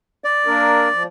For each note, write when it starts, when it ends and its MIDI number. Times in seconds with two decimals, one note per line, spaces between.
0.24 1.03 74
0.46 0.89 58
0.46 0.89 62
0.46 0.89 70
0.93 1.07 53